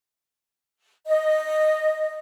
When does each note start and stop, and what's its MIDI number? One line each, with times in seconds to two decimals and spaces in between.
1.07 2.19 75